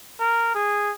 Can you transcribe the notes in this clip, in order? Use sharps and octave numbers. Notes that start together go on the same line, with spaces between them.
A#4
G#4